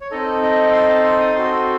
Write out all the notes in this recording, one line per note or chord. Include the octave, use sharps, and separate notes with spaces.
C#5
C4 D#4 A4 D#5
D#5
C6
A5
C6
D#6
C4 F#4 A4 C6